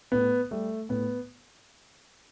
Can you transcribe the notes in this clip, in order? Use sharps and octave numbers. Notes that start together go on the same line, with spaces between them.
A2 B3
G3 A3
A2 B3